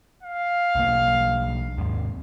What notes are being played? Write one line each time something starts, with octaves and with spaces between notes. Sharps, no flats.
F5
B1 A#3
D#2 G#2